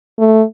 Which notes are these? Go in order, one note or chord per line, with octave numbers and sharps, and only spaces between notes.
A3